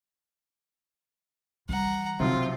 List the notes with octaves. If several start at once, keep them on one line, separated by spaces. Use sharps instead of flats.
E3 G3 F#5 A#5
B1 C3 F3 C4 F4